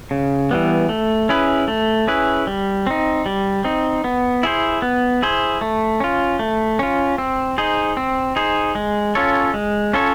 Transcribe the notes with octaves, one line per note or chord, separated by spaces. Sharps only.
C#3
E3 G3 B3
A3
C#4 E4 G#4 B4
A3
C#4 E4 G#4 B4
G3
C4 D#4
G3
C4 D#4
B3
E4 G#4 C5
B3
E4 G#4 C5
A3
C#4 F4
A3
C#4 F4
C4
D#4 G#4 C5
C4
D#4 G#4 C5
G#3
C#4 F4 A4 C#5
G#3
C#4 F4 A4 C#5